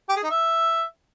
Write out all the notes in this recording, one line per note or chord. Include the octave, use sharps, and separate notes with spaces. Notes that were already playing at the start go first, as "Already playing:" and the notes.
G4
G#4
D#4
E5